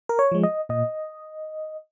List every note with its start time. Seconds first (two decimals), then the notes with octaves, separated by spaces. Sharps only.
0.09 A#4
0.19 C#5
0.32 F3 G#3
0.43 D#5
0.69 A#2 D#5